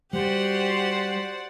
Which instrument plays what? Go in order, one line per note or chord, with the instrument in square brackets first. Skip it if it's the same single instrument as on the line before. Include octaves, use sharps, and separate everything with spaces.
[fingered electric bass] G3 [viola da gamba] F#4 G4 [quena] C5 [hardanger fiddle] D5 F#5